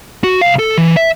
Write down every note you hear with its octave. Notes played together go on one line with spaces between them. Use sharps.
F#4
C2 F5
A4
E3
E5